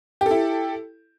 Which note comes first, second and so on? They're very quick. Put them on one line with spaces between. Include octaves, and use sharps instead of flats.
G4 A4 E4